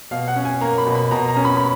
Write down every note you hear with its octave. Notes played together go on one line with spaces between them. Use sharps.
B2 F5
F#5
C#4
G#5
A#3 A#5
B5
B2
B5
B2 A#5
A#5
C#4
B5
B5